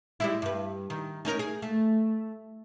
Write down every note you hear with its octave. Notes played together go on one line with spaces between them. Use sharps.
G3 G#3 E4
G2 B4
D#3
C#4 D#4 A#4
G#4
A3